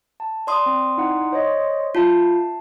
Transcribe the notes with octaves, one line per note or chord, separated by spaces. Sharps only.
A5
D5 C6 D#6
C4 C5
D#4 E4 F#5
C5 C#5 D#5
F4 E5 A5 C7